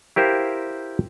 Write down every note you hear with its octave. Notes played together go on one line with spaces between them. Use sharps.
E4 G4 A#4 C5 F5 G5